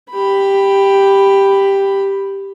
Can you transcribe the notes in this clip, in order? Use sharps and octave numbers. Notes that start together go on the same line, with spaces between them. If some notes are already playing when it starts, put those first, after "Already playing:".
G4 B5